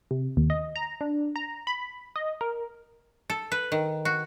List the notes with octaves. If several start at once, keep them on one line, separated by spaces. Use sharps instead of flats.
C3
D#2
D#5
A#5
D4
A#5
B5
D#5
A#4
A4
B4
D#3
F#4